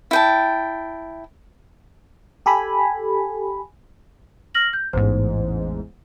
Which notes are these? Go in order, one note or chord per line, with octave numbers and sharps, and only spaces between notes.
E4 G5 A5
G4 A4 G#5 B5
F6 A#6 F#7
G6
A1 E2 G#2 C5